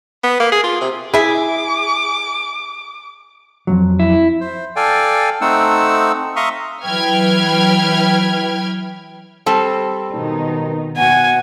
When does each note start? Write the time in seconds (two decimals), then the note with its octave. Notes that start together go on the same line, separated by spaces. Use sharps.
0.24 B3
0.40 A#3
0.52 G#4
0.64 F4
0.81 C3
1.14 E4 G#4 E5 D6
3.67 F2 G#2 F#3
3.99 E4
4.41 C5
4.76 A4 D5 F5 G5 G#5
5.41 A3 C4 D#4 F#5 E6
6.36 E5 F5 A#5 C6 C#6 D#6
6.85 E3 F#3 B4 G5 F6 G#6
9.46 G3 C4 A4
10.14 B2 D#3 D#4
10.97 B2 F#5 G#5